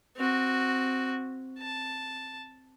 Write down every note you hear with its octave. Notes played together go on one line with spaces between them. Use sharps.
C4 F#4
A5